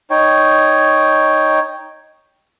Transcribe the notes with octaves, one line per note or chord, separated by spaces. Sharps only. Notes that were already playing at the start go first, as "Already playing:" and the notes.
D#4 C#5 G5